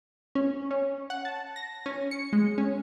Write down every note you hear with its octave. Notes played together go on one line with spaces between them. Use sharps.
C#4
C#4
F#5
A5
A#6
C#4
C#7
G#3
C#4